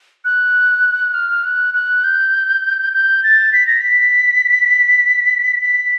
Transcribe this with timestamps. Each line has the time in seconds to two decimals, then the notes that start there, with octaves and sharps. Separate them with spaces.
0.25 F#6
1.14 F6
1.44 F#6
1.74 F#6
2.04 G6
2.93 G6
3.23 A6
3.53 B6
3.67 A#6
3.81 B6
5.62 B6